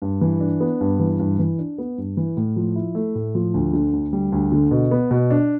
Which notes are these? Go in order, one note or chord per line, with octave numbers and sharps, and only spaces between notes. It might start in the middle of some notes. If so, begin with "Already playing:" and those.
G2
E3
D4
B3
G2
E3
G2
E3
D4
B3
G2
E3
A2
F3
E4
A3
A2
F3
D2
D3
D2
G3
D2
D3
B2
B3
B2
D4